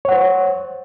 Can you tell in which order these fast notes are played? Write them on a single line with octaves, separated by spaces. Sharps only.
C#5 F#5 C5